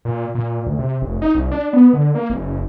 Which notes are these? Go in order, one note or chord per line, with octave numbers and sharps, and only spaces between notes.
A#2
A#2
D2
C3
F1
D#4
C2
D4
B3
D3
A#3
F#1